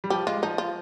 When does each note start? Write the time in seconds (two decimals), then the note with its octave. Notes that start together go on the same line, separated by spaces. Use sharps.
0.04 G3
0.10 F3 G4
0.27 G#3 F4
0.42 F3 D#4
0.58 F4